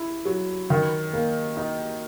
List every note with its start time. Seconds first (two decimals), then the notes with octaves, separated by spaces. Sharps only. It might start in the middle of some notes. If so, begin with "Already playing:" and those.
Already playing: E4
0.25 F#3
0.70 D#3
1.13 A#3
1.57 D#4